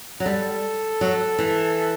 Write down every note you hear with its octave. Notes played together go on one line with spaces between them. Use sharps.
F#3
G3 A4
F#3
E3